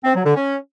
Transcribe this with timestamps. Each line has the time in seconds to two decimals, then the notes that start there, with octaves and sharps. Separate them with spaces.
0.04 C4
0.14 F#3
0.25 D3
0.35 C#4